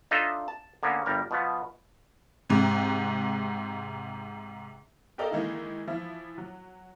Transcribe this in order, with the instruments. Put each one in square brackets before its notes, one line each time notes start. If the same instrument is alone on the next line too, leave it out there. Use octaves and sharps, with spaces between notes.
[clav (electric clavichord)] D4 D#4 F4 A4 D#5 E5
A5
D3 A#3 B3 C#4
G1 G3 A#4
B2 F3 B3
[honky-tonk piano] G#2 C3
G4 A4 A#4 D5 D#5 F5
D#3 E3 G#3 A#3 D#4 E4
E3 F3 E4 F4
F#3